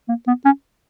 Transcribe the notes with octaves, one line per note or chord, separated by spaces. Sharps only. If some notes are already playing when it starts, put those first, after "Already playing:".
A#3
B3
C#4